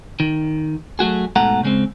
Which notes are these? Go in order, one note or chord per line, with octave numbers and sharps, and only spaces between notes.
D#3
F#3 A3 F#4 G#4
G#2 B2 A3 A4 F#5 A#5
C#3 G#3 C4